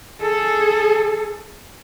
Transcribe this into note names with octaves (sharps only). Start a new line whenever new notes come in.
G#4 A4